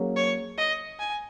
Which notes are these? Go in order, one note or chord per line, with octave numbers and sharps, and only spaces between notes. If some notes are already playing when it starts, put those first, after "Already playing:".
Already playing: F#3 A#3 C#4 G#4
C#5
D#5
G#5